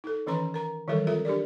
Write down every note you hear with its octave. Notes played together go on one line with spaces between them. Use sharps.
D#4 A4
D#3 E3 C#4 B4 A#5 C6
A#4 A#5
D#3 E3 F#3 G3 A4 A#4
C4 F4 A4 A#4 E5
D4 G4 A#4 D5